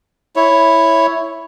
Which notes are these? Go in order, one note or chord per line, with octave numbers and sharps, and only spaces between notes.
E4 C#5